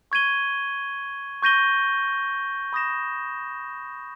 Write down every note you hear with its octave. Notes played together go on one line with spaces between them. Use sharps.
C#6 G#6 D#7 G7
C#6 G6 A#6 D#7 G7
B5 D#6 A#6 E7